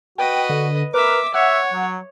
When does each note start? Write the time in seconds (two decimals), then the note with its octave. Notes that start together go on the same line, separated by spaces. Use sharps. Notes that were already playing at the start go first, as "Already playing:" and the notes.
0.18 F#4 B4 D#5 G5
0.49 D3
0.94 A#4 B4 E5 D6
1.34 C#5 E5 F#5
1.74 F#3